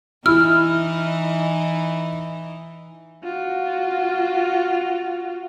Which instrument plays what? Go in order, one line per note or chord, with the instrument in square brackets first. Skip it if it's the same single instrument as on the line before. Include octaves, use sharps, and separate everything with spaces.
[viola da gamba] E3 D#4 [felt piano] E4 [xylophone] E6 F6
[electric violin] F4 F#4